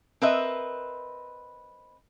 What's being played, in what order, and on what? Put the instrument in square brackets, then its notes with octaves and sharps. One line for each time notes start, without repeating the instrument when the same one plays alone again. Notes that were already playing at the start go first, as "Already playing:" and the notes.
[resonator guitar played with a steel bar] C4 A#4 B4 D#5 E5